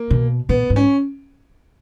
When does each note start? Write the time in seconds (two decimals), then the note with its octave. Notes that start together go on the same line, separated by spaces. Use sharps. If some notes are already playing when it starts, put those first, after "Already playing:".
Already playing: A#3
0.10 B2
0.49 A#2 B3
0.70 G#2
0.76 C#4